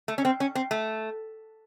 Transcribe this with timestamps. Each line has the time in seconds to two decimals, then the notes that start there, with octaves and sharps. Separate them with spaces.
0.08 A3
0.18 C#4
0.25 C4
0.40 C#4
0.55 C4
0.71 A3